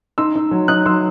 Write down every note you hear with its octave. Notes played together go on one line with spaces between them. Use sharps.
D#4 C6 E6
D#4
F#3
D#4 D#6 F#6
F#3 C6 E6